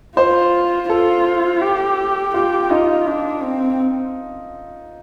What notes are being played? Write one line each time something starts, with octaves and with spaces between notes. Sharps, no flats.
F4 C5
F4 A4
G4
F4 G4
D#4 F4
D4
C4